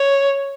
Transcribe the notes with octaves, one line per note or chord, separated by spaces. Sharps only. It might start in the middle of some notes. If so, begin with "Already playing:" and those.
Already playing: C#5